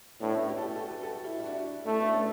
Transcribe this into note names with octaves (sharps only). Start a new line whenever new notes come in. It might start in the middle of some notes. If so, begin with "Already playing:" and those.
A2 B3 D4
C#4 E4
E4 G4
A4
E4 G4
F#4 A4
G4 B4
F#4 A4
E4 G4
E4
D4 F#4
A3 C#4 E4
B3 D4
A3 C#4